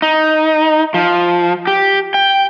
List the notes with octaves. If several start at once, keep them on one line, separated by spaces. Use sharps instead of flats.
D#4
F3
G4
G5